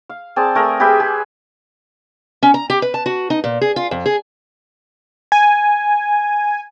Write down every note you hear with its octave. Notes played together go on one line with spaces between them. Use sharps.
F5
C4 G#4 D5 A5
A3 G#4 A#4
G4 G#4 B4 E5
G#4
C#4
A#5
G4
B4
A5
F#4
D#4
A#2
G#4
F4
F2
G#4
G#5